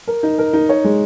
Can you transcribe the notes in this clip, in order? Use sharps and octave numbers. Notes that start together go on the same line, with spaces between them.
A#4
D#4
A#4
D#4
C#5
G#3